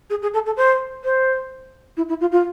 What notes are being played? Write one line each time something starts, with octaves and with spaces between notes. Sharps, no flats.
G#4
G#4
A4
A4
C5
C5
E4
E4
F4
F4